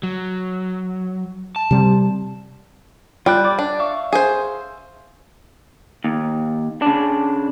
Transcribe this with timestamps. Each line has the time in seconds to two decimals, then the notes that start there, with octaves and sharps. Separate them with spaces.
0.03 F#3
1.56 A5
1.71 C3 G3
3.26 G3 F4 G5 F#6
3.44 D5 D6
3.59 D4 D5
3.79 E5 F5 C#6
4.13 G#4 C5
6.04 D#2
6.82 C#3 D4